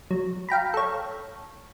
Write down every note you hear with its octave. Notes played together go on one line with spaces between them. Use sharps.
F#3
F5 G5 A#5 B5
A4 C#5